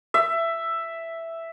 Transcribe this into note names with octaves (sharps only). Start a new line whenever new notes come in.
E5